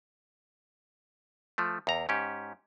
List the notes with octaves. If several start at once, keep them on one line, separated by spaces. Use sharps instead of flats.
F3 A3
E2 A#5
G#2 C#4 G4